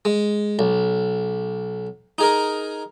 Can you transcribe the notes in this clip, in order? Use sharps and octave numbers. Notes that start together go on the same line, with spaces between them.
G#3
B1
D#4 G#4 A#4